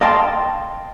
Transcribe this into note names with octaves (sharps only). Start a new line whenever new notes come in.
D#5 F5 G5 A5 C6